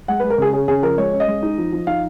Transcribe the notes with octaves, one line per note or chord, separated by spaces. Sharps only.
G#3 F#5
G#3 B4
A#4
C#3 G#4
C#4 G#4
C#3 G#4
F3 A#4
G#3 C#5
C#4
D#5
G#3
D#4
F3
F3
D#4 F5